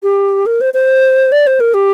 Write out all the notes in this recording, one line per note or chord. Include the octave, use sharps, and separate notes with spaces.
G4
A#4
C5
C5
D5
C5
A#4
G4